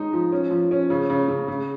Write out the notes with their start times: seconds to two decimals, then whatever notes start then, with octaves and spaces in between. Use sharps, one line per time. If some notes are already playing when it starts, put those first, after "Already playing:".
Already playing: G#3 D#4
0.13 F3
0.32 C#4
0.51 F3
0.71 C#4
0.90 C#3
1.10 C#3
1.28 C#3
1.48 C#3